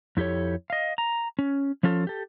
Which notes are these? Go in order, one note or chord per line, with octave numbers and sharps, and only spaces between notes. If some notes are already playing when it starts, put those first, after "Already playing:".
F2 E4 G4 A4 C#5
D#5 F5
A#5
C#4
F3 C#4 F4 A4
G4 A4